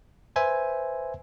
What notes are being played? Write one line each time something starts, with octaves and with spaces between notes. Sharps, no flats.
B4 C5 E5 G#5